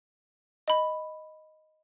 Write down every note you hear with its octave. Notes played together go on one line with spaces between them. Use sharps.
D#5 B5